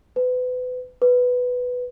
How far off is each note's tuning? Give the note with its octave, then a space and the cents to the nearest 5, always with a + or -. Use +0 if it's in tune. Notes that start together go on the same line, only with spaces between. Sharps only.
B4 +30
B4 +5